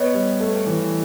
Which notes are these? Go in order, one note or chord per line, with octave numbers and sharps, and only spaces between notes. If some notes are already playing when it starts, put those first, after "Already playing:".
Already playing: B3 C#5 D#5
G3
A3
E3